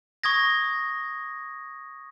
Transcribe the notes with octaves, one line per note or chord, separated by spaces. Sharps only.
C#6 D#6 G#6 A#6